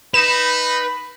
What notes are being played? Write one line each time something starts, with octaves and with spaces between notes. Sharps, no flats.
D#4 B4 B5 E7